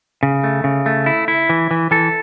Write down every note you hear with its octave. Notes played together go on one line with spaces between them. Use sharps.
C#3
A3
C#3
A3
E4
E4
E3
E3
E3 A4